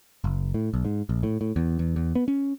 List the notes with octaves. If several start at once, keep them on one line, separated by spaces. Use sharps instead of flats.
F#1
A2
B1
G#2
A#1
A2
A2
E2
E2
E2
B3
C#4